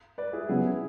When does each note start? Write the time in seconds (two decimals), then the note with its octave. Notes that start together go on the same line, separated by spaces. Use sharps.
0.18 B4 D5
0.33 E4 G#4
0.49 C#3 F#3 B3 E4 G#4